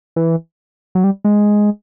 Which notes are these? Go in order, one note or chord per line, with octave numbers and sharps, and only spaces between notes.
E3
F#3
G3
G#3